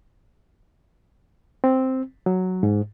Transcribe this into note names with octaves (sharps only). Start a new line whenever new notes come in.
C4
F#3
G#2